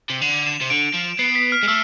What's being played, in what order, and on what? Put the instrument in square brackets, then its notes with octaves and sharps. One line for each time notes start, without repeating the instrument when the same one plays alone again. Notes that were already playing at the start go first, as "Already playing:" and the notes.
[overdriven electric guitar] C3
[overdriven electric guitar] D3 [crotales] F7
[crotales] E7
[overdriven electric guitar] C3
[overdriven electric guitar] D3 [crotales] D7
[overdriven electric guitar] F3
[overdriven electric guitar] B3 [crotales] C7
[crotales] B6
F6
[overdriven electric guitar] G#3
[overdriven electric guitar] A3 [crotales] E6